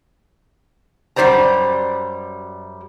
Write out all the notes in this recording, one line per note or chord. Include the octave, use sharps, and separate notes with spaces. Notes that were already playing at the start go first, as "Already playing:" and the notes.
F#2 G3 G4 C5 D5 A#5